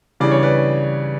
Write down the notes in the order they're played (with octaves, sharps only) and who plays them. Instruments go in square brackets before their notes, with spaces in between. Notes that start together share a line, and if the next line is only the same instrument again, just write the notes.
[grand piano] C#3 E3 G3 D4 D5
C#5
B4 D5